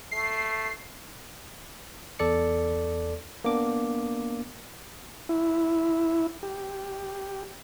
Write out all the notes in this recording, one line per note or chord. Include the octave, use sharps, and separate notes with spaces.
A3 C7
E2 A4 D5 C#7
A#3 B3 D4 D6
E4
G4